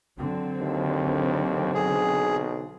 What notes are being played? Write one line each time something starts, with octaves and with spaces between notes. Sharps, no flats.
D3 F#3 C4
D#2
B1 G#4